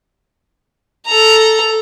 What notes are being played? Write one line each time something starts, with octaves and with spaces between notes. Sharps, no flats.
A4 A#5